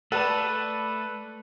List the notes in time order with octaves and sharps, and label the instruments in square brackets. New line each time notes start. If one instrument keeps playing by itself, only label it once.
[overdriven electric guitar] A3 [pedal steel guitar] A4 [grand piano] B4 D5 A5